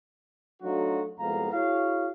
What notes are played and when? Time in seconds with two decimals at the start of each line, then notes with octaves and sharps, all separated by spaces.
0.62 F#3 A3 D4 D#4 F4 F#4
1.19 C2 F2 G#3 B3 F5 A#5
1.52 E4 F#4 G#4 C#5 F5